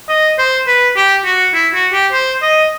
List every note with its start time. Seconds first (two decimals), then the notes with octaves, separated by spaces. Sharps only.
0.09 D#5
0.38 C5
0.67 B4
0.96 G4
1.25 F#4
1.54 E4
1.74 F#4
1.93 G4
2.12 C5
2.42 D#5